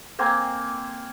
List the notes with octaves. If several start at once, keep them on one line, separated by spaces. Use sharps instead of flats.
A#3 C4 G#5